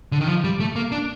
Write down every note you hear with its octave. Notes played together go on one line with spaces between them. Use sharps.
D3
D#3
F3
G3
A3
A#3
D4